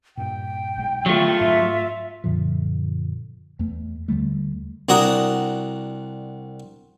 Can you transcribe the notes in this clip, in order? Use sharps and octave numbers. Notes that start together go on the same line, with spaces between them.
G2 A#2 G5
B1 G#3
D3 F3 F#3 A3 B3 F4
G#2 E5
F#2 A#2 D3 F3
E2 A3
D#2 D3 G3 A3
C2 D4 F#4 F#5 A#5 D#6